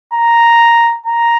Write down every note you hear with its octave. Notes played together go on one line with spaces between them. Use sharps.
A#5
A#5